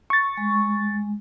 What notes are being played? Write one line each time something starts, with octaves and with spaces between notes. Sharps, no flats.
C#6 A6
G#3